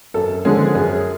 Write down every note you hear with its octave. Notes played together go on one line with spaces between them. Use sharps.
F#2 A4
D3 F3 G#3 C#4 G#4
F#2 G#4